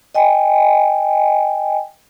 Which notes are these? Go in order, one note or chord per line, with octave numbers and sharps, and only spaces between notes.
D#5 G5 G#5